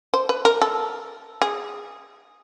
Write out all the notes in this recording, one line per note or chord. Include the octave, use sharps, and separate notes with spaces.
C5
B4
A#4
A4
G#4